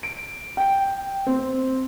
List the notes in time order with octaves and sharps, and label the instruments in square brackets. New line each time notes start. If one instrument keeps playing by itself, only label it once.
[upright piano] D7
G5
C4